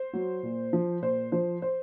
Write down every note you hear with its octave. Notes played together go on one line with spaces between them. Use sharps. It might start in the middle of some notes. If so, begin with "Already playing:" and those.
Already playing: C5
F#3
A#2
F3
A#2 C5
F3 C5
C5